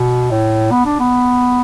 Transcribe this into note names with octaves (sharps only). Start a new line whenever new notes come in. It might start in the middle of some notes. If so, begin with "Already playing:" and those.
Already playing: B2
A2
B3
D4
B3